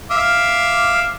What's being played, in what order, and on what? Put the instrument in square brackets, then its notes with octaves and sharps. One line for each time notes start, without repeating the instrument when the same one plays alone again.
[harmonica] E5 F5 D6